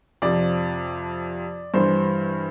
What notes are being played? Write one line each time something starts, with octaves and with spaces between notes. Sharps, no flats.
F2 C3 F3 D5
G2 E3 G3 C5